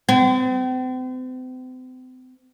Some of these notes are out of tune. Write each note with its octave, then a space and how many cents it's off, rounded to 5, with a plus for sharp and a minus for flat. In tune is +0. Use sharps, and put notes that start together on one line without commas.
C4 -40